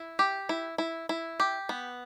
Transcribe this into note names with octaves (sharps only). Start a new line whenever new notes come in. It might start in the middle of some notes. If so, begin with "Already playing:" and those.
Already playing: E4
G4
E4
E4
E4
G4
B3